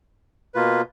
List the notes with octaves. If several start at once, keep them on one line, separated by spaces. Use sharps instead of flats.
B2 A#3 F4 B4